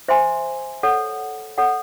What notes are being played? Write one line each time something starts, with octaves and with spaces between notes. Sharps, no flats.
C5 E5 G#5 C6
A4 C#5 F#5
A4 C#5 F#5